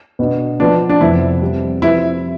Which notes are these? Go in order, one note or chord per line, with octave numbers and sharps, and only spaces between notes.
B2 B3 D4
F3 B3 D4 F4 B4
D4
F2 C3 F3 B3 E4
G3 C4 G4
F3 C4 E4 G4 B4